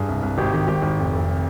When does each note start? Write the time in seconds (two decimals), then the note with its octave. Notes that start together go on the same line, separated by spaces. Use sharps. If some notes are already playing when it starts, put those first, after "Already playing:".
Already playing: G2 G#4
0.09 C2
0.23 C2
0.38 G#1 G4
0.53 D#3 G4
0.68 G#1 G4
0.82 G#1
0.98 F1
1.13 F1